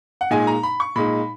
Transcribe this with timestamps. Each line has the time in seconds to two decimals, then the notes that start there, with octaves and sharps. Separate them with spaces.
0.21 F#5
0.31 A#2 G#3 D#4 G#5
0.47 A#5
0.63 B5
0.80 C#6
0.96 A#2 G#3 D#4 B5